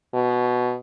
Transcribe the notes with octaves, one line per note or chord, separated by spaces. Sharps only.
B2